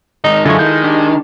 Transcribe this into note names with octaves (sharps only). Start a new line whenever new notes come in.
D#3 G#3 D#4
F#2 D3 G#3 E4 F4 A4 C#5
D#3 G6
D4 G4